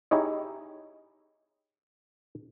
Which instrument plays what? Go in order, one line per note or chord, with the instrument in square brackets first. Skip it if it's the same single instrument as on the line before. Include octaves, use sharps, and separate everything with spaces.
[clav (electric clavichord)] D#4 E4 G4 G#4 C#5 D#5